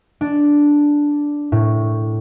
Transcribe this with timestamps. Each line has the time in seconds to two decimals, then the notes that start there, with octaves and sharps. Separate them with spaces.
0.21 D4
1.52 A2